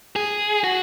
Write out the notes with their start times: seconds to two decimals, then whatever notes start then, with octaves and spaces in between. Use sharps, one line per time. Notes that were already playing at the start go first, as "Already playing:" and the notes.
0.16 G#4
0.64 F#4